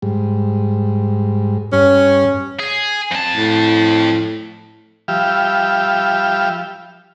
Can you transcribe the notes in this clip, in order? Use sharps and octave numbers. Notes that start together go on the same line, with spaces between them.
G#2 G3
G2 C#4
G#4
F2 A5
A2
F3 G3 G4 E5 F5